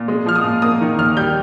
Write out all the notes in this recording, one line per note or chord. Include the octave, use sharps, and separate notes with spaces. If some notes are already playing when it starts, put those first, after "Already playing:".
Already playing: A#2
G#3
F3 F6
D#6
A#2
A#3 D#6
D#3
D#2 F6
G3 G6